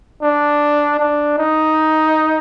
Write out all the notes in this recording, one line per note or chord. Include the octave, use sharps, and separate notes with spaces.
D4
D4
D#4